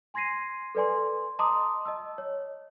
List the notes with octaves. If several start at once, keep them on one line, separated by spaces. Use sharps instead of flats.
G#5 C6 G#6 A#6 C7 D#7
A4 B4 D5 G#5 C6
D#5 A5 A#5 C6 D6 D#6
D#5 A5 E6
C#5